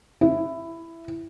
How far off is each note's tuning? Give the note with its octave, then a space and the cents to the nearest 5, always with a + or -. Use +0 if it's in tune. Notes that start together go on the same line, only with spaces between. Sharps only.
E4 +10